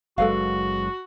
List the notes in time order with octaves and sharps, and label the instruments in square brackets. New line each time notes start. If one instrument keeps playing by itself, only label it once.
[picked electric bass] F#1 F#3 G#3 [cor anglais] F#4 [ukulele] A4 B4 F5